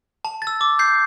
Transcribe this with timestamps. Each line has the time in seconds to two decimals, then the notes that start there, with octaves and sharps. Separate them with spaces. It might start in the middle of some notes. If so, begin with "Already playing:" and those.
0.25 A5
0.42 A6
0.47 E6
0.61 D6
0.79 G6 C7